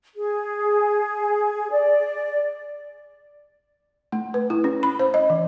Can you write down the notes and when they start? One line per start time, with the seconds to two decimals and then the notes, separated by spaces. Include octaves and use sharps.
0.15 G#4
1.71 D5
4.12 A3
4.34 B4
4.50 E4
4.64 C#4
4.83 B5
4.99 C5
5.14 D#5
5.30 E3